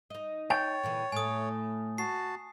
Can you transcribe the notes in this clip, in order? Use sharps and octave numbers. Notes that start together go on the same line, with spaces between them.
D#4 D#5
C#5 G5 A6
A#2 D3 E3
A2 A3 G#5 D#6
F#4 A5 C7